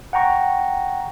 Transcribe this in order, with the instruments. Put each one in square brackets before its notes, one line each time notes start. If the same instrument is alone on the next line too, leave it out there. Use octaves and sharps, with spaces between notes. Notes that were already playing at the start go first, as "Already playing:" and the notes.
[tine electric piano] F#5 G5 A#5 C#6